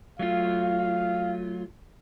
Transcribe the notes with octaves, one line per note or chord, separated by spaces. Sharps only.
F#3 A3 F4 F5